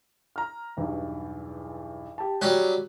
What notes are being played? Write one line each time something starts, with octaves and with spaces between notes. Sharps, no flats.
A#5 F6
B1 E2 G2
G4 A5
F#3 G3 C#4 F#6